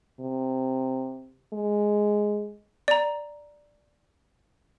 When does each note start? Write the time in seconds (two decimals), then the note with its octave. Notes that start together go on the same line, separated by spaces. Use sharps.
0.20 C3
1.53 G#3
2.88 D5 A#5